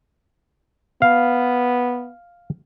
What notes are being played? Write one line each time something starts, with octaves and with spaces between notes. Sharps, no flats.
B3 F5